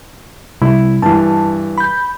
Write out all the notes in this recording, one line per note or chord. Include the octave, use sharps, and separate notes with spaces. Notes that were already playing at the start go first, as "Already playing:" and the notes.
C3 G3 E4
G2 E3 A5
B5 G6